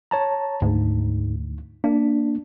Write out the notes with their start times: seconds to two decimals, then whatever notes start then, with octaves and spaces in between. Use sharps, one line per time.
0.11 C#5 A5 A#5
0.62 D2 G#2
1.84 A#3 D4